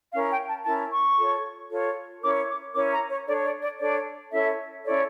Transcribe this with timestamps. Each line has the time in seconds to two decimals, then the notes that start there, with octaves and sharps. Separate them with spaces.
0.13 C#4 E4 A#4 F5
0.31 G5
0.48 A5
0.65 C#4 E4 A#4 A5
0.92 C#6
1.18 F4 A4 C#5
1.70 F4 A4 C#5
2.23 C#4 E4 A#4 C#5 D6
2.49 D6
2.75 C#4 E4 A#4 C#5 D6
2.92 A#5
3.10 C#5
3.27 D4 A4 C#5 D5
3.44 D5
3.63 D5
3.79 D4 A4 C#5 D5
4.32 C#4 E4 A4 C#5 E5
4.84 C#4 E4 A4 C#5 D5